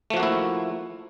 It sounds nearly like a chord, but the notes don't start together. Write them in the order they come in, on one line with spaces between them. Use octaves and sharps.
A3 F3 F#4 A#3 E4